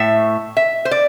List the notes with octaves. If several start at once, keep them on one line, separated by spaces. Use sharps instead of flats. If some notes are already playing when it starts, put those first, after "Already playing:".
Already playing: A2 A3 E5
E5
C5
D5